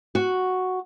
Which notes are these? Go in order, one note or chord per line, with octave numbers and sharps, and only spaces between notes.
F#4